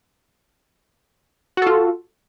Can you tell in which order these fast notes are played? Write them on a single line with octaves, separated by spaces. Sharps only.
F#4 A4 F4